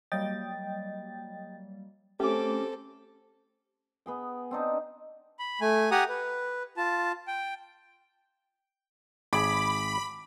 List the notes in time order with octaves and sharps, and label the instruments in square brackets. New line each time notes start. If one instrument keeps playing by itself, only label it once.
[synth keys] F#3 G3 A#3 [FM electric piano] D#5 G5 A6
[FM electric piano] A3 [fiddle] C4 A4 [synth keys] C#4 D6 [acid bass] G4
[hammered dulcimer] B3 G#4 G5
C4 D4 D#4
[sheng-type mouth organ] B5
A3 G#5
G4 F#5 G#5 A#5 D#6
B4
F4 A5
G5
[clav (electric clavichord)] G#1 G#4 [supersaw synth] B5 [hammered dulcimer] D6